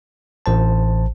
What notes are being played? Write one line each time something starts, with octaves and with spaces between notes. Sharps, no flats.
A1 C5 A5